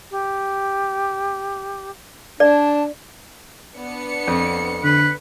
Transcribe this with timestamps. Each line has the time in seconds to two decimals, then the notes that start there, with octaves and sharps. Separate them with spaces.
0.11 G4
2.40 D4 D5 A5
3.76 B3 D4 C#7
4.28 F2
4.84 D3 B4